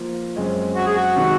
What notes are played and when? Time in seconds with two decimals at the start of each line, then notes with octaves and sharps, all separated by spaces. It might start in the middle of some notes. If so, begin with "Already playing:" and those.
Already playing: F3 A#3 F4
0.36 F#2 C#3 G#3 C4
0.75 F#4
0.86 G#4
0.95 F#4
1.16 C3 D#3 G#3